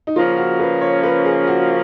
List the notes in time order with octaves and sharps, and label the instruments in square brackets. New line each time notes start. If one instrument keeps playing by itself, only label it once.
[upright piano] D#4
[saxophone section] C#3 F3 A#3 C#4 [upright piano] F4
[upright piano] F#4
B4
C#5
B4
G#4
F#4